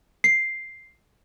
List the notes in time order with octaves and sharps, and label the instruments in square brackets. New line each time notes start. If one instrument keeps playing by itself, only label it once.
[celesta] C7